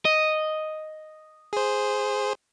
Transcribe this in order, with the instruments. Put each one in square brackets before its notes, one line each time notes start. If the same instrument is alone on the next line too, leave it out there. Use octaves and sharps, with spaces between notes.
[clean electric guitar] D#5
[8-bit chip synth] G#4 C5